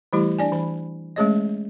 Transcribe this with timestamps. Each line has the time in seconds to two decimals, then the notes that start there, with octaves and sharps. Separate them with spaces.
0.13 E3 G3 A3 E4 G4
0.39 D4 D5 G#5
0.52 E3 B5
1.16 G#3 A3 C#4 G#4 C#5 D#5